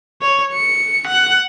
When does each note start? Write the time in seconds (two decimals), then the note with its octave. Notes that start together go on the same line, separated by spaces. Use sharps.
0.22 C#5
0.54 C#7
1.07 F#5